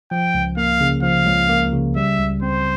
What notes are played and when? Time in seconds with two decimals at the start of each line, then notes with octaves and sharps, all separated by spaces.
0.11 F3 G5
0.34 C#2
0.57 A#3 F5
0.81 C#3
1.03 F3 F5
1.26 C#2
1.49 A#3
1.72 C#3
1.96 G3 E5
2.19 C#2
2.42 C4 C5